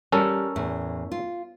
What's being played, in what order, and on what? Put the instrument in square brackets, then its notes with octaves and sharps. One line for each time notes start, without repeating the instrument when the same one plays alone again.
[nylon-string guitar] G3 [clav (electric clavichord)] C#4 A4 A#4
[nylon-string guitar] E2 A2
F4